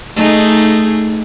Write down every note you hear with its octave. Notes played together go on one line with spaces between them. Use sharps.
A3 D#4 G#4